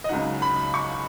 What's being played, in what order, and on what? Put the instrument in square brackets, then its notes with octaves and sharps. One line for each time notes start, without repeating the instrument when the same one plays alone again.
[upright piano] D#5
C#2 C#3 F#3 D#4 F#5
B5
C#6